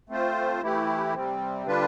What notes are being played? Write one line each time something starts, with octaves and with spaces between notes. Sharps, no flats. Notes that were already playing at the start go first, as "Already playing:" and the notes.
A3 C4 F4 C5
E3 A3 E4 G4
C3 G3 C4
D3 G3 D4 F4 B4